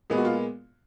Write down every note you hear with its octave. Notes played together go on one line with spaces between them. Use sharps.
A#2 G#3 B3 G#4
F#4
F4